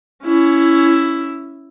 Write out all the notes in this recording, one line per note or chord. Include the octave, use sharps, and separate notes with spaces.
C#4 E4